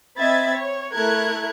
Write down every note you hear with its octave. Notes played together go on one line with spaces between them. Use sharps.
C4 D#5 E5 B5 G#6 A6
C#5
A3 E4 A#4 F#6 G#6